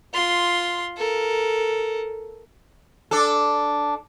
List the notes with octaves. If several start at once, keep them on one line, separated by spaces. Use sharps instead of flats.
F4 C6
A4 A#4
D4 A4